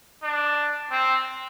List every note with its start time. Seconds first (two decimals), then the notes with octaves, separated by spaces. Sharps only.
0.23 D4
0.91 C4